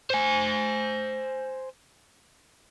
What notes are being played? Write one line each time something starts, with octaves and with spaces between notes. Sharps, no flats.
C5 G#5